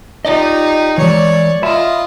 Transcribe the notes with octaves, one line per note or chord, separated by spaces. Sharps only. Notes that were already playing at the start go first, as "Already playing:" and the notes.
D#4 F4 G4 D5 D#5
E3 G#3 C#5 D5
F4 D#5 E5 B5